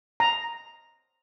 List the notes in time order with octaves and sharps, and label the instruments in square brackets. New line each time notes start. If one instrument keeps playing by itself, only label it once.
[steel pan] A#5